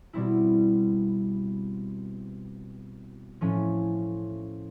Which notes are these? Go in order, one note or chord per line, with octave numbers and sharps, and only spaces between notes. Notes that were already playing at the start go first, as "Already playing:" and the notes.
B2 G3 C4 E4
A2 F3 A3 C#4